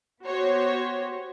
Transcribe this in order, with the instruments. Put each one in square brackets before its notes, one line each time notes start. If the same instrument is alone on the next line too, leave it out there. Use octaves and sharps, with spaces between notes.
[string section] B3 F#4 G4 C5 C#5